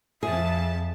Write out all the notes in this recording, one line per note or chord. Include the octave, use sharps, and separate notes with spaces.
F2 G#4 E5 A5